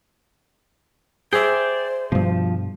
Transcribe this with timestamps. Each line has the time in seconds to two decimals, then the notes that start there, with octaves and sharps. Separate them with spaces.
1.33 G#4 C5 D5 E5 G5
2.12 G2 B2 F3